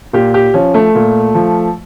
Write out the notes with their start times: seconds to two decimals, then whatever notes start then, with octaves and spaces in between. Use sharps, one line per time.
0.13 A#2 G4
0.34 G4
0.54 F3 C#4
0.74 A3
0.95 A#2
1.35 F3